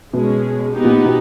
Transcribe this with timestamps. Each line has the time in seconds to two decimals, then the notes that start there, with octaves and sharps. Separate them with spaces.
0.13 B2 G#3 C#4 G#4
0.74 B3 D#4 G4
0.84 A#2
1.05 B2